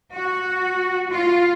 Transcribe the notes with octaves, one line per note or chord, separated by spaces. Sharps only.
F#4
F4